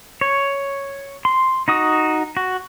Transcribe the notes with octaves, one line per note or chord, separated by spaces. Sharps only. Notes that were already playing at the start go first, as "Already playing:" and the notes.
C#5
C6
D#4 F#4 D#6
F#4